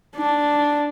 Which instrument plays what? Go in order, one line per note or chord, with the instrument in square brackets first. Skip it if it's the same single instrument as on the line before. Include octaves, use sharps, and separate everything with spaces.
[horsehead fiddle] D4